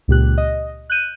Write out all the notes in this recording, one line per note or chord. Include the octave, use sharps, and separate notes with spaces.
C#2 A#2 G4 F#6
D#5
F#6 G6 D#7